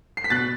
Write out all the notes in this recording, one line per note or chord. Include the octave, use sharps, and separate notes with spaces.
C7
B6
B2 F#6 A6